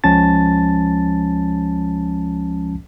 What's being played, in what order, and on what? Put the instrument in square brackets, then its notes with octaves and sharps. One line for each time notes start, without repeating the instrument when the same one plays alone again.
[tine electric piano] C#2 F3 G#3 C#4 A5 A6